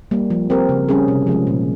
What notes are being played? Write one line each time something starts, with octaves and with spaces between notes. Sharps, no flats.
G3 A#3
F3
C4 G4 A#4
C#3
G3 C#4 G#4
C3
F3 G#3 C#4
A#2